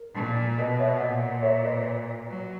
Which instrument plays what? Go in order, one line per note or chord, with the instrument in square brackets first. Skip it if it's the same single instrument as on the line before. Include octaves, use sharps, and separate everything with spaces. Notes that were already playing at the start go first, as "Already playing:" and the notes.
Already playing: [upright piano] A#4
[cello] A#2
[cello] B2 [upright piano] B4 D#5
[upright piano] C#5 E5
[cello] A#2 [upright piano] D#5 F#5
[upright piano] C#5 E5
B4 D#5
[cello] F#3